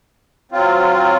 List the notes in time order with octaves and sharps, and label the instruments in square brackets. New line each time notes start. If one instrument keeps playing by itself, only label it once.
[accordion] F#3 C4 F4